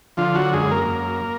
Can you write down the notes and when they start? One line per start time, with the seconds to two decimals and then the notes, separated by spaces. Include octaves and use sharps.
0.17 D3 F3 F4
0.35 F#3 F#4
0.53 F#2 G#3 G#4
0.71 A#3 A#4
0.89 F#2